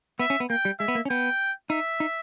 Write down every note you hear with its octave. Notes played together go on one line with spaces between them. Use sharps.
B3 E5
C#4
B3
A#3 G5
G3
G#3 E5
B3
A#3
C#4
B3 G5
D#4 E5
D#4